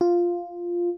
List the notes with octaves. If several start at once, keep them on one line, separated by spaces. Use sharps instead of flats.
F4